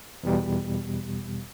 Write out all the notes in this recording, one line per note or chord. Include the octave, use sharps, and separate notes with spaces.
E2 B2 G3